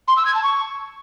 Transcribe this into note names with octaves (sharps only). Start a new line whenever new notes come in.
C6
E6
G#6
A5
C#6